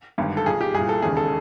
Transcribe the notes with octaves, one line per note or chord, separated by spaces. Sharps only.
G#1 G2 D3
A4
B1 A#2 G#4
G4
C2 A#2 G#4
A4
E1 D#2 C#3 G#4
A4